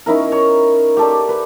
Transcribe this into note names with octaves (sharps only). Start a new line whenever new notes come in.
C#4 D#4 E4 A#4
C#5
G4 A4 D5
B4